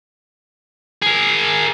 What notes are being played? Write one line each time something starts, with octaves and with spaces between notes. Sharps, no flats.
G#4 A#4